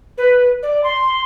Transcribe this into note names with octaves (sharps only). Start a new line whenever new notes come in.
B4
D5
C6